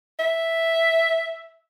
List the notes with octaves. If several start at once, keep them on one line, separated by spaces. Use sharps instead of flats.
E5